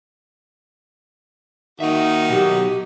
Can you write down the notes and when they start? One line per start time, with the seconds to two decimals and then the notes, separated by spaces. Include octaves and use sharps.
1.80 D#3 A#3 D#4 F#4 E5
2.30 B2 F#3 G4